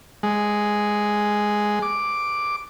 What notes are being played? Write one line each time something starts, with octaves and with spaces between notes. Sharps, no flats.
G#3
D6